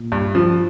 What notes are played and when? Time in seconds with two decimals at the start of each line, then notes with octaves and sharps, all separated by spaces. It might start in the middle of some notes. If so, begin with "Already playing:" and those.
Already playing: A#2
0.12 G2
0.35 F3